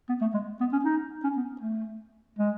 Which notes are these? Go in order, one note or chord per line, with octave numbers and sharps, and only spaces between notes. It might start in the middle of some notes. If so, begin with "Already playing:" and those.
B3
A3
G#3
B3
C#4
D#4
C#4
B3
A3
G#3